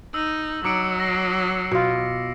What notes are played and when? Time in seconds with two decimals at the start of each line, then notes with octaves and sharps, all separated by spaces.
0.14 D#4 E6
0.65 F#3 D#4 D6 C#7 D7
1.00 A#6 C7
1.71 B2 F4